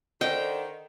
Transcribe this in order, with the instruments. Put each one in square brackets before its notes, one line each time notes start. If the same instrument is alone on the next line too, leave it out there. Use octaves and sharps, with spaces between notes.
[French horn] D3 [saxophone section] D#3 C5 [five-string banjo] D#5 [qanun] G5